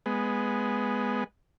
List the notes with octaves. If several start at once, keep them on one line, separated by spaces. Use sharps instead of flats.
G#3 B3